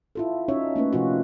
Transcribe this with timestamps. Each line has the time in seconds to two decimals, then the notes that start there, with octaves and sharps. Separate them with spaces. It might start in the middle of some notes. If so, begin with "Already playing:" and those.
0.15 E4 F4 A4
0.48 C#4 D#4 F#4 C#5 E5
0.76 A3 A#3 C#4 B4
0.93 C3 F3 F4 F#4